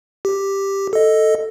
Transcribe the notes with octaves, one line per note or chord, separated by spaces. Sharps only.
G4
A4 D#5